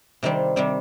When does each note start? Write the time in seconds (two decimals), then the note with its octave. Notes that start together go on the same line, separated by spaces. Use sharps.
0.23 C3 D#3 G3 C4
0.56 C3 D#3 G3 C4